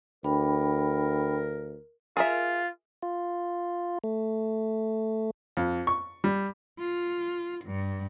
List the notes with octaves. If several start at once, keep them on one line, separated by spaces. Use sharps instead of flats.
D2 D4 A#4 G5 B5
F4 G#4 A#4 E5
F4
A3
F2
C#6
G3
F4
G2